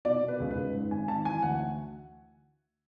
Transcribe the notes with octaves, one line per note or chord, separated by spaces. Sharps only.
B2 D5
B2
B4
C#2
B4
C#2
G#2
G#1 G#5
G#1 A5
E3 G#5
D2 F#5
F#5